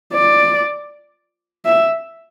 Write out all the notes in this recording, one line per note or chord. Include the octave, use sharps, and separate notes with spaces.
D5
E5